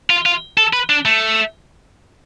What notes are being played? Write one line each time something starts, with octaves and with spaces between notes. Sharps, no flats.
F4
F4
A4
B4
D4
A3